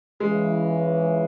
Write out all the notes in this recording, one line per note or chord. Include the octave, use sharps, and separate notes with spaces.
C#2 C#3 E3 G#3